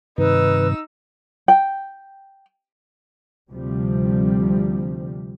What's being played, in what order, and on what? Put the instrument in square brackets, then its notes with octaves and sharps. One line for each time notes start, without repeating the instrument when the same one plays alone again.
[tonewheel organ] G2 C3 D#3 [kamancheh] D#4 E6 [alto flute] B4
[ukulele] G5
[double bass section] D2 C3 F3 G3